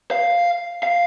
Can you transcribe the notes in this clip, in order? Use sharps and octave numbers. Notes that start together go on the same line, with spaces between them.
F5
F5